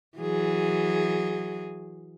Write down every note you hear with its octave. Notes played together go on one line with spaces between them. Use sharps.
E3 F#3 G#4